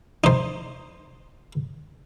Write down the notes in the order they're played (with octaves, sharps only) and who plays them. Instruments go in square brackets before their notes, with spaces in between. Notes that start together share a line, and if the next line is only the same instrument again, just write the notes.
[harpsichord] D#4 C5